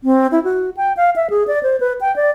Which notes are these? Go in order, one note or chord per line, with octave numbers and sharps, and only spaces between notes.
C4
E4
F#4
G5
F5
E5
G#4
D5
C5
B4
G5
D5